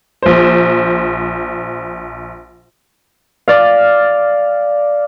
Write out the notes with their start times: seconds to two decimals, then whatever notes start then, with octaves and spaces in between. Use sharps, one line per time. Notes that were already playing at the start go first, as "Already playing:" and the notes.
0.22 A#1 C5
3.48 D5 F5